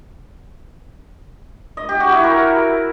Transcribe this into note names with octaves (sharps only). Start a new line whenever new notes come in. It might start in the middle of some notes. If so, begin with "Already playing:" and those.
D#5
G4
F#4
E4
A#4